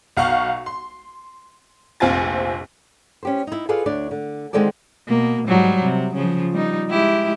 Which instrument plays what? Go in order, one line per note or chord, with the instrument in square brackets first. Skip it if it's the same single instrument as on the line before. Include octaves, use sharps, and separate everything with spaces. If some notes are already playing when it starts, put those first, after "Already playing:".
[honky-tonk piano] B1 F5 F#5 C#6
C6
F1 A#1 C4 F4 G#5 A6
[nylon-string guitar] C#4 G4 C5
D#4 E4
F4 G#4 A4 B4 D5 F5
D2 D4 C#5 D5
D3
D3 D#3 G#3 C4 A4 D5
[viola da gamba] B2 A#3
G#2 F#3 G3
C3
C#3 F3 F4
G3 D#4
G#3 E4 G4